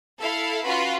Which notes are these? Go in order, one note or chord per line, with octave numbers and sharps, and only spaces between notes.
E4 A4 F5
C#4 F4 F#4 B4 B5